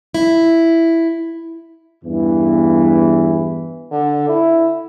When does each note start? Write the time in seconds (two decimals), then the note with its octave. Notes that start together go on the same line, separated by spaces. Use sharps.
0.14 E4
2.04 E2 G2 E3
3.91 D3
4.29 E4